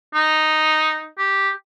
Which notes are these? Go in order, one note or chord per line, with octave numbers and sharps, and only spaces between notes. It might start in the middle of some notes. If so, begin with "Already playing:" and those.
D#4
G4